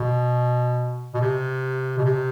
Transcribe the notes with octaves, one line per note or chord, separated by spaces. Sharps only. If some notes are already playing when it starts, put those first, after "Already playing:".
Already playing: B2
B2
C3
B2
C3